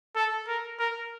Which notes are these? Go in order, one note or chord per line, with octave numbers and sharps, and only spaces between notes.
A4
A#4
A#4